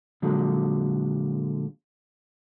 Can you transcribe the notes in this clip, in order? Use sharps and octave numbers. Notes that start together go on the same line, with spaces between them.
A#2 D3 F3 F#3 G#3